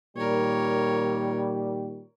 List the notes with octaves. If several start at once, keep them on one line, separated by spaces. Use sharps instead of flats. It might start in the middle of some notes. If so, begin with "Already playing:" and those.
A#2 D#3 G3 A#4 C#5